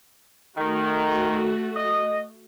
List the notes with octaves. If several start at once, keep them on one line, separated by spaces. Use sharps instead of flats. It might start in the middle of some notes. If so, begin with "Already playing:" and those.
D#3 A3 F#4
D#5